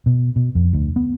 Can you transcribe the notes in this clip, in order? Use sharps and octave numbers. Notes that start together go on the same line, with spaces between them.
B2
B2
F2
D2
B3